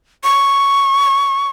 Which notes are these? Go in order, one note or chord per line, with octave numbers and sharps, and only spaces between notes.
C#6